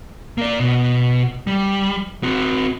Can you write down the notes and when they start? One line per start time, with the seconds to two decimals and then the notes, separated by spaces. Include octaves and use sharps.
0.38 A#3 D5
0.60 B2
1.47 G3
2.23 C4 F#4